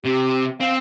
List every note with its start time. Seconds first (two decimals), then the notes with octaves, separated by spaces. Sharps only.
0.05 C3 G4
0.60 C4 F5